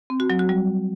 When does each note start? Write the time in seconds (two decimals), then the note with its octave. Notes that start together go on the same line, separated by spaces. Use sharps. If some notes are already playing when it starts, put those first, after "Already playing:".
0.10 C4
0.20 F#4
0.30 F#3
0.39 F#4
0.49 G3